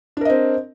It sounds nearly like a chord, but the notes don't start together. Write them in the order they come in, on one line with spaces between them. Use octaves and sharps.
D4 A#4 D#5 C4